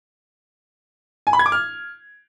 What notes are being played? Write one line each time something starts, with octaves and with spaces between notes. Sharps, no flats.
G#5
B5
G#6
D6
F6